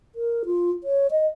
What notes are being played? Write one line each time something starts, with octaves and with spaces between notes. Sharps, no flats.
A#4
F4
C#5
D#5